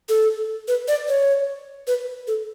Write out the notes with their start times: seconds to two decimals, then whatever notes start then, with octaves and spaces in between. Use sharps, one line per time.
0.09 A4
0.68 B4
0.88 D5
1.08 C#5
1.88 B4
2.28 A4